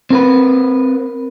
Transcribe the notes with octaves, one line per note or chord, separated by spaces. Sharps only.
C4 A#4 B4